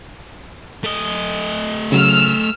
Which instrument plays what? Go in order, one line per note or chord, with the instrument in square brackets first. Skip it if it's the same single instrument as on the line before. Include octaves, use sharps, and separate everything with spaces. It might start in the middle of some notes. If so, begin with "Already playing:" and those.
[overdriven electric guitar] A3 D#5
[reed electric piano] C#3 F#3 [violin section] E6 F6